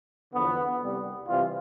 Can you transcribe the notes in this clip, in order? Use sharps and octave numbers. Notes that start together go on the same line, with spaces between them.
E2 D3 F3 B3
C2 C3 G3
C3 E3 G3 F4